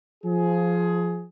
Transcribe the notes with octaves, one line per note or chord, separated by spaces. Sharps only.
F3 G#4